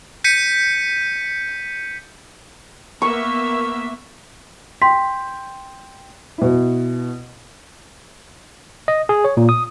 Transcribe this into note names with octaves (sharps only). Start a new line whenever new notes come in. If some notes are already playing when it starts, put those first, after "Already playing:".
G6 B6 C#7 D#7
A#3 B3 E5 C#6
G5 C6 B6
B2 E4
D#5
G#4
C#5
A#2
D#6